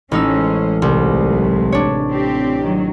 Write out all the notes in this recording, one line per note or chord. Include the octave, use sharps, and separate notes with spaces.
A1 G#3 C#4 D#4 C5 E6
C2 F#3 G#3 A3
D4 C#5
C4 G4
D#3 F#3